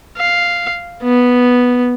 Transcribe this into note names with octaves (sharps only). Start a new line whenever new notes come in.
F5
B3